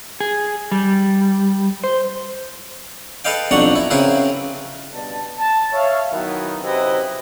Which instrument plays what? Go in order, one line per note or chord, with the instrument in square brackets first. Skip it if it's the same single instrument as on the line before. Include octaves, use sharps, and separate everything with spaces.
[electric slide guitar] G#4
G3
C5
[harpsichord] A4 B4 D#5 F5 G5
B1 F2 D4 F#5 A#5 C#6
E4
C#3 C4 E4 G#4 A#4 B4
[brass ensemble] G2 B2 D5 A5
A5
C#5 E5 F5
B2 D#3 F#3 B3 D#4 E4
F#2 C3 C4 E4 B4 D#5